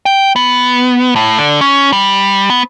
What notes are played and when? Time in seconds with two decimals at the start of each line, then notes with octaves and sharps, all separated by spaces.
0.06 G5
0.36 B3
1.16 A2
1.38 D3
1.61 C#4
1.92 G3
2.50 B3